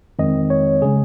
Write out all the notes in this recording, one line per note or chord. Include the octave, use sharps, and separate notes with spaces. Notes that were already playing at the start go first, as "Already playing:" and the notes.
F2 D#3 G#3 C4 D#5
C#5
C#3 G#3 G#4